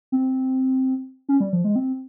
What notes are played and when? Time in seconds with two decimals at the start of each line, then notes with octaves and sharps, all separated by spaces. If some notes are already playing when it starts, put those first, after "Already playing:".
0.12 C4
1.29 C#4
1.40 G3
1.53 F3
1.64 G#3
1.76 C4